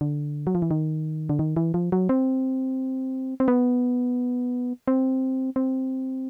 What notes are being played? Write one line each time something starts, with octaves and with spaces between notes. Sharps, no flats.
D3
F#3
F3
E3
D#3
D3
D#3
E3
F3
F#3
C4
C4
B3
C4
C4